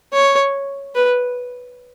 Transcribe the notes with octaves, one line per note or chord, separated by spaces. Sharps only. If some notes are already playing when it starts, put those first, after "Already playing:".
C#5
B4